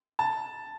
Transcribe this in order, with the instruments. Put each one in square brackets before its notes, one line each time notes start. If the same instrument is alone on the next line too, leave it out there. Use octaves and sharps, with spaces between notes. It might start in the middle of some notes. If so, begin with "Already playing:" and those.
[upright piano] A5